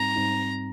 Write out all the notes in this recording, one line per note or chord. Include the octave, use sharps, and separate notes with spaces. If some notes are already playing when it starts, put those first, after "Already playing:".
Already playing: G#2 G3 C4 D#4 A#5
G#2 G3 C4 D#4